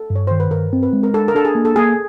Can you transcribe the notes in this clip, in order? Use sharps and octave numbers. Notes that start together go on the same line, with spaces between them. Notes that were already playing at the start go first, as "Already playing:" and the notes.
Already playing: A4
G2
C#5
D#3 C5
B4
G2 A#4
C4
B4
G#3
A#4
D4 A4
A#4
D4 A4
G#4
A#3
A4
A#3 G#4